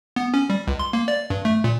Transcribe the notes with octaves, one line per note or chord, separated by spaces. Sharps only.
B3
C#4
G3
C#2
C6
A#3
D5
G2
A3
A#2